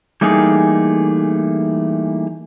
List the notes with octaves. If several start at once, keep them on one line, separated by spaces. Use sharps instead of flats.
E3 G3 A3 A#3 D#4 G#4